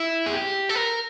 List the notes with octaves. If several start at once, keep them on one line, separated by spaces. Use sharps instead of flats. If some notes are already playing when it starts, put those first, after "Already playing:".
Already playing: E4
G#4
G4
A4
A#4